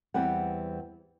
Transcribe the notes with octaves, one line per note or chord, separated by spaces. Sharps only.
E2 G3 C4 B4 F#5